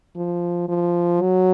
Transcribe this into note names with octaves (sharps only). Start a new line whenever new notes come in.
F3
F3
F#3